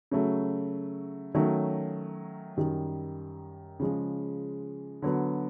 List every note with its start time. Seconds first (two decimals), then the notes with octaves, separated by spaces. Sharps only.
0.11 C#3 F#3 A3
1.35 D#3 F#3 A3 C#4
2.57 F#2 D#3 G3
3.80 C#3 F3 G#3
5.02 D3 F#3 B3